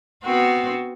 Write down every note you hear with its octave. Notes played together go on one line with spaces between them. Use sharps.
B3 C4 F#4